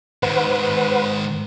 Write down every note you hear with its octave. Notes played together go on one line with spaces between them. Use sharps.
G#2 D#3 B4 C5 F#5